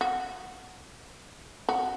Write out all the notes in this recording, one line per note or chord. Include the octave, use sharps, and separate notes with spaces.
F#4
F#4